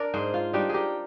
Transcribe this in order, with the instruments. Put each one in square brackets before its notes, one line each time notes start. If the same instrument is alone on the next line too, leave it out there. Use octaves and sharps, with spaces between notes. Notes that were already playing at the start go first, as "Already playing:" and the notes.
Already playing: [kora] D4 A#4 D5
G#2 G#4 C5
F4
G3 D4 D#4 G4
G4 G#4 A#4